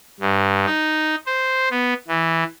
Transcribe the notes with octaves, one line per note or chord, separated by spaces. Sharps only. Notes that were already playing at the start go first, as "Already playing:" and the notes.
G2
D#4
C5
B3
E3